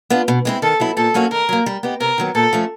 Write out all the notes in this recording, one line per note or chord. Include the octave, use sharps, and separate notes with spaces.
B3 D4 F4
B2
G#3 C4 E4
D#3 A4
F#3 B3 E4
A#2 A4
F#3 A#3 C#4 F#4
D#3 A#4
F#3 A#3
G3
B3 D#4 G4
C3 A#4
D#3 F#3 B3
A#2 A4
F3 A3 C#4